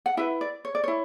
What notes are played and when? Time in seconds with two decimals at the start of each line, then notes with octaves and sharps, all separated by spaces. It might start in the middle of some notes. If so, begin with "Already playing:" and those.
0.06 F#5
0.17 E4 B4 E5
0.41 D5
0.65 C#5
0.75 D5
0.84 E4 C#5